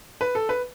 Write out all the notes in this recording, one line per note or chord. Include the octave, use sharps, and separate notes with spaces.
B4
A4
B4